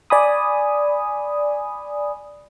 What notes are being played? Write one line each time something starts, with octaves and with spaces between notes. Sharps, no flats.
D5 G#5 B5 D#6